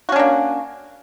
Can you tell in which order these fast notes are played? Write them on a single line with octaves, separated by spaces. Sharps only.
F#4 C#4 D4 A#3